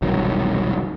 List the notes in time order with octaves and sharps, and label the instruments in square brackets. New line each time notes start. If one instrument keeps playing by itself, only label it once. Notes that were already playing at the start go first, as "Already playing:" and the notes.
[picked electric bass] E1 C2 D#3 F#3